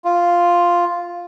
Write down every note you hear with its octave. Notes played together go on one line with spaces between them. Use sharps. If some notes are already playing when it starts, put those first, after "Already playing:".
F4